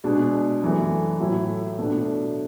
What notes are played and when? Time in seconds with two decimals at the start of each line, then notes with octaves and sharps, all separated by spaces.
0.04 B2 G#3 D4
0.62 F#2 E3 A3
1.20 A2 F#3 A3 E4
1.78 B2 A3 D4